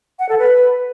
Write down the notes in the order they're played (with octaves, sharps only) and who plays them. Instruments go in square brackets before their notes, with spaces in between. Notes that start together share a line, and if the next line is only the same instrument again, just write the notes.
[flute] F#5
A4
B4